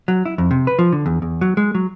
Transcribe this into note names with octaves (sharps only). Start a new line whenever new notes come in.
F#3
E4
F2
C3
B4
F3
D3
E2
E2
F#3
G#3
F#3